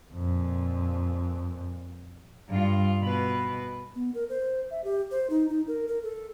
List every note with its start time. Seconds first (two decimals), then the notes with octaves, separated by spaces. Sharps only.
0.13 F2 A#2
2.49 G2 F4
3.02 B2 B4
3.95 B3
4.14 A#4
4.29 C5
4.71 E5
4.84 G4
5.11 C5
5.30 D#4
5.49 D#4
5.68 A#4
5.88 A#4
6.03 A4